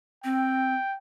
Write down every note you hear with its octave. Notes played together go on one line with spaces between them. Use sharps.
C4 G5